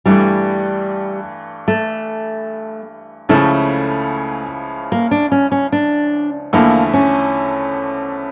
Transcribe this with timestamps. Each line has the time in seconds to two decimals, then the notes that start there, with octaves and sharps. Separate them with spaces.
0.06 G2 E3 G3 A3
1.68 A3
3.29 C#2 C#3 F3 A3 C#4 E4
4.92 A#3
5.11 D4
5.32 C#4
5.52 C#4
5.72 D4
6.53 E2 D3 F3 A3 A#3 E4
6.93 C#4